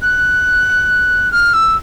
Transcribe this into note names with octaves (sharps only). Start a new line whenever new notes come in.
F#6
F6
E6